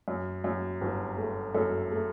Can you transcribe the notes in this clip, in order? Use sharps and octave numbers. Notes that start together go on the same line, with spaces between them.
F#2
F#2
G1
A3
F#2 A4
A3